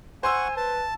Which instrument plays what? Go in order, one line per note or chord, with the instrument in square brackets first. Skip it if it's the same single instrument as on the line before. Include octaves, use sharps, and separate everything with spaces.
[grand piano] C5 C6 E6 [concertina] F#5 C#6 [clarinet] G#5
[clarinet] B4 [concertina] A5